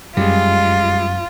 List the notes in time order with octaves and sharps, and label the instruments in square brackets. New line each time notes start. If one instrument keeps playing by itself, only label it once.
[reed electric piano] F#2 [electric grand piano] G3 G#3 [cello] F4